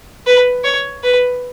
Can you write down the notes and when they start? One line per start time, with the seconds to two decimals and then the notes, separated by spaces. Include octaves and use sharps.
0.26 B4
0.64 C#5
1.04 B4